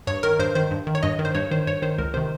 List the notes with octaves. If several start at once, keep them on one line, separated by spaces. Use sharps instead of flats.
G2 C#5
D#3 A#4
G2 C5
D#3 C5
G2
D#3
C#5
G2 D#5
D#3
C5
G2 C#5
D#3 C5
G2 C#5
D#3 C5
C#2 A#4
C3 D#3 C5